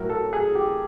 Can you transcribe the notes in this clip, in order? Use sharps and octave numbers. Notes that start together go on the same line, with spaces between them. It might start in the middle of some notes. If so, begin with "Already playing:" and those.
Already playing: A2 F#3 A#4
A4
G#4
G4